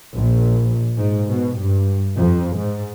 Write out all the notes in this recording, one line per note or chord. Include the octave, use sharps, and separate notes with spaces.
A#1
G#2
B2
G2
F2
G#2